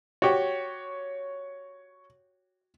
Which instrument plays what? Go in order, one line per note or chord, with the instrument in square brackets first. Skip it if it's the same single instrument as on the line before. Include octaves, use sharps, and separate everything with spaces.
[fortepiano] F#4 G4 [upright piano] C#5